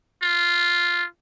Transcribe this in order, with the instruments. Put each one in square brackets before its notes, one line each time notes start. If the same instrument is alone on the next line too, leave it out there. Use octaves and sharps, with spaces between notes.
[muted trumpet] F4